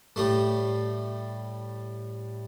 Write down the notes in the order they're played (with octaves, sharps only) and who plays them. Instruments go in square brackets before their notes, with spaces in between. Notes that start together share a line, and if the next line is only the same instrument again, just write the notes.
[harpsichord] A2 G3 A3